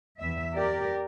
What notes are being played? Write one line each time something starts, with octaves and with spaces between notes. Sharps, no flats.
E2 E5
G4 A#4 D5